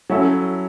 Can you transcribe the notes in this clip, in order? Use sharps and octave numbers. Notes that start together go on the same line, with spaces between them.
F#3 C#4 E4 A4